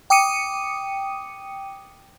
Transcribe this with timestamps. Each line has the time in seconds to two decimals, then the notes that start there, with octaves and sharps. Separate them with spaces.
0.10 G5 D6 D#6 C#7 D#7